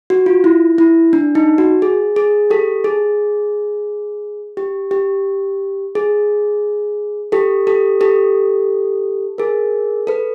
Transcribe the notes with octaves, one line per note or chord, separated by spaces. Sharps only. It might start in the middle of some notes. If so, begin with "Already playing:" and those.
F#4
F4
E4
E4
D4
D#4
F#4
G#4
G#4
G4 A4
G#4
G4
G4
G#4
G4 A4
G4 A4
G4 A4
G#4 A#4
A4 B4